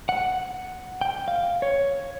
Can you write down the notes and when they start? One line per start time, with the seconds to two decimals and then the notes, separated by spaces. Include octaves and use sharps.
0.09 F#5
1.01 G5
1.28 F5
1.62 C#5